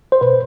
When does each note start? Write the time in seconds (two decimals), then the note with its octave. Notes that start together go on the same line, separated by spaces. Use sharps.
0.12 C5
0.21 B2 B4